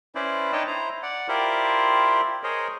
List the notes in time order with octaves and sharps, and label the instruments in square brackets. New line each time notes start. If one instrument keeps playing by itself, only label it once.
[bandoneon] C#4 E4 B4 C5 D5
D4 D#4 C#5 D#5 G5 A5
E4 C5 A#5
D5 F#5
E4 F4 G4 A#4 C5 D5
G#4 A#4 C5 C#5 D#5